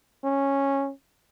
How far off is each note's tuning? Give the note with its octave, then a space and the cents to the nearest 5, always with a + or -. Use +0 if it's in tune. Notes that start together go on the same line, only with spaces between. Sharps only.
C#4 -10